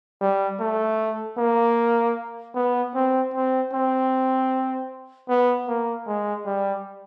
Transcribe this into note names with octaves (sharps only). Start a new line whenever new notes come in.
G3
A3
A#3
B3
C4
C4
C4
B3
A#3
G#3
G3